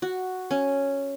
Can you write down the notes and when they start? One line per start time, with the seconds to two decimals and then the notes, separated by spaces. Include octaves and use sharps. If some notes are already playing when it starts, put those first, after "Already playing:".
0.02 F#4
0.51 C#4